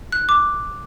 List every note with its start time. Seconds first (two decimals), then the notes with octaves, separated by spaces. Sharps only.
0.12 F#6
0.29 D6